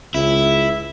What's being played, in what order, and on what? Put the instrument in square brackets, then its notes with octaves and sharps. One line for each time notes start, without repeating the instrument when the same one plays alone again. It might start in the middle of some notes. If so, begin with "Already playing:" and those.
[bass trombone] C#2 [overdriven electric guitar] E4